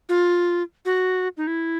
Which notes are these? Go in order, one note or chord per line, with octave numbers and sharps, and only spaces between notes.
F4
F#4
D#4
E4